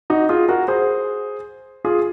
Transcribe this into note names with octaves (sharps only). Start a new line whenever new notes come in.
D#4 F#4
F4 G#4
F#4 A#4
G#4 C5
F4 G#4